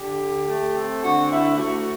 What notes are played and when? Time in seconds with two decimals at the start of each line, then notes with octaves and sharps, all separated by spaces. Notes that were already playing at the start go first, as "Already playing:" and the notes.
Already playing: D3 G4
0.21 D2
0.47 A3
0.74 C4
1.01 D3 F#4
1.28 D2 E4
1.55 A3 F#4